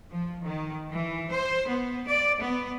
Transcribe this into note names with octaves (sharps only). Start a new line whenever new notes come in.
F3
D#3
E3
C5
B3
D5
B3